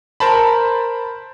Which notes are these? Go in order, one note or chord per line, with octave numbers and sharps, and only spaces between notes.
A#4 C5 A5 B5